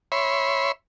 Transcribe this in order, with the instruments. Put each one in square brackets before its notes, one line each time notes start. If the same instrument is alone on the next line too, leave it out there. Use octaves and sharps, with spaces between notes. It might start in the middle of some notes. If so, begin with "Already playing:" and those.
[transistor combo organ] C#5 E5 B5 C6